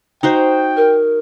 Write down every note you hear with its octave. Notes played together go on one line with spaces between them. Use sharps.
D#4 F#4 C5 G5
A#4